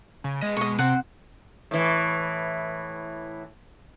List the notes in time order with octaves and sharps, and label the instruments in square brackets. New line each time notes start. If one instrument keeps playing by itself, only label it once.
[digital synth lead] C#3
[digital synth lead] G#3 [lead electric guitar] B3 D#5
[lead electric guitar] B2 [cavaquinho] D#5 C#6
[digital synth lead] C3 [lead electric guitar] C4 [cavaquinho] F#5
[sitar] A2 E3